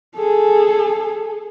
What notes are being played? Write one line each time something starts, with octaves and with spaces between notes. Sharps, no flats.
G#4 A4